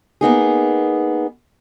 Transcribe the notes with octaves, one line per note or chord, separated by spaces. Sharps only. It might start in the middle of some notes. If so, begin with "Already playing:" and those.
A#3 B3 D#4 G#4